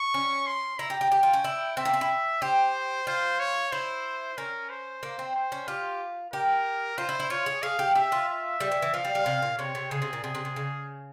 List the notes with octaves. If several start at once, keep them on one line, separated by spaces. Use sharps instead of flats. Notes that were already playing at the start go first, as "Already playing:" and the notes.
Already playing: C#6
C#4
C6
E4 A#5
G4
G4
G4 G5
F4
C#4
E4
C4 E5
A#3
C4
E4
G4 C5
F4 C5
C#5
E4 C5
C#4 A#4
C5
A#3
C4
C5
C#4
F4 G4
G4 A#4
F4 C5
E4
E4
F4 C#5
G#4
G#4 F5
G4
G4 E5
F4
E5
G3
E3
E3
F3 F5
G3
G3
C3
A#2
C3 C#5
C3
C#3 G#4
C3
A#2
C3 G#4
C3
C3
C#3